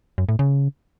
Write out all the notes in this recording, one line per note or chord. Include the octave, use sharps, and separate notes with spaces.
F#2
A2
C#3